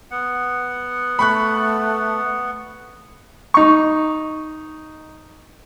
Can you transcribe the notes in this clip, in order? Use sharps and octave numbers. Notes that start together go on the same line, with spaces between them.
B3 F#5
A3 B5 C#6 F#6
D#4 C#6